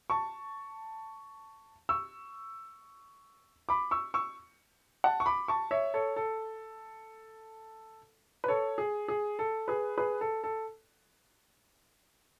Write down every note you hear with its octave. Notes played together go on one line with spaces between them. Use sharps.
A5 C#6
C#6 E6
B5 D6
C#6 E6
C#6 E6
F#5 A5
C#6
B5 D6
A5 C#6
C#5 E5
A4 C#5
A4
B4
A4 C#5
G#4
G#4
A4
G#4 B4
G#4 B4
A4
A4